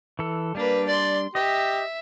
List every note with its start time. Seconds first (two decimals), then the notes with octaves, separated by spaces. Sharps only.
0.19 E3 A4
0.55 G3 A#3 D4 B4
0.88 D5 C6
1.35 G4 D#5 E5